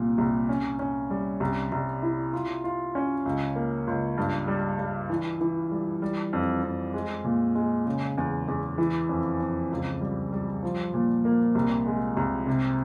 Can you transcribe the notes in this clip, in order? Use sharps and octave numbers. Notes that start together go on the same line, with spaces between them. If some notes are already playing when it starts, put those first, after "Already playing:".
Already playing: C2 A#2
C2
C#4
C#4
G3
C2
C2
E4
F4
F4
C#4
C#2
A#3
C#2
G2
G3
G3
E3
E3
G3
G3
F2
F2
G#3
A#2
G#3
C#3
E2
E2
E3
F2
F2
C#2
G3
G3
F3
A#2
A#3
C2
G#3
C2
C3